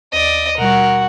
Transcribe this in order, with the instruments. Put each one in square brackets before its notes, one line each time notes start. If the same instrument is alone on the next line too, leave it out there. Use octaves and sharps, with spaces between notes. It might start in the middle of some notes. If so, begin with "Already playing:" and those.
[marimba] D#2 [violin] D5 D#5
[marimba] B2 G3 [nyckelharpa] F#4 F#5 [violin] A#4